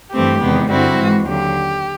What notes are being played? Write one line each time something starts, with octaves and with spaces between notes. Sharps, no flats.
G2 E3 A3 C4 G4
E2 C3 D#3 G#3 B3
G2 D3 G3 C4 E4 F#4
G#2 E3 G#3
D#2 D3 F#3 G4